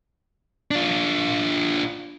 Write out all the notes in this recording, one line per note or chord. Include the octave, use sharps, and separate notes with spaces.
D4 F4